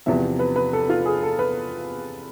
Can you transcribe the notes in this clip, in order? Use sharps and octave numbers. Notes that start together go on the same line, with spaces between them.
E2 C3 F3 B3 E5
B4
B4
A4
F4
G#4
A4
B4